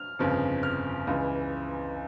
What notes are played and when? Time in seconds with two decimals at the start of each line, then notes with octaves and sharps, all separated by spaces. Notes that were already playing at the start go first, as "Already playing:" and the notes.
Already playing: F6
0.19 G1 F2 C#3 F3
0.63 F6
1.07 C#2 C#3 E3